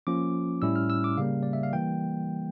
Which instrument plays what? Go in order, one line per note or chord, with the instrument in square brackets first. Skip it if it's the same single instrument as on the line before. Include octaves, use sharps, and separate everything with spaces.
[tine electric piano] F3 A#3 C#4 F4 D6
A2 G3 C#4 E4 E6
F6
E6
D6
C#3 G3 A#3 F5
D5
E5
F5
E3 G3 A#3 G5